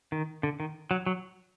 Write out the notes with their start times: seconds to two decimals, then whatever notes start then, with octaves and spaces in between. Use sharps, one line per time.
0.12 D#3
0.43 D3
0.60 D#3
0.91 F#3
1.06 F#3